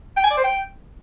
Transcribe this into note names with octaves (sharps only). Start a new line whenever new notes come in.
G5
G#5
D5
C5
G5